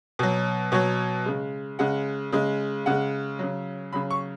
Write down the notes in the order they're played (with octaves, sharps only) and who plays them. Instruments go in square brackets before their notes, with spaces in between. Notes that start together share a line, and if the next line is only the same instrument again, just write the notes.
[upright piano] B2 F#3
B2 F#3 C#5
C#3 G#3
C#3 G#3 F#5
C#3 G#3
C#3 G#3 F#5
C#3 F#3
C#3 F#3 B5
C#6